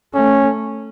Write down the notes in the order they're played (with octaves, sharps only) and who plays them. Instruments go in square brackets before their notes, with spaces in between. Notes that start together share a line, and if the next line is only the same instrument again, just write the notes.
[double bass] A3 [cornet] C#4